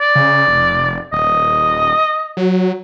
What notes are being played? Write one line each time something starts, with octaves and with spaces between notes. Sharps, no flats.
D5
C#3
F1
D#1 D#5
F#3